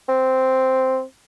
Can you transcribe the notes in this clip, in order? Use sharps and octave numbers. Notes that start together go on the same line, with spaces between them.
C4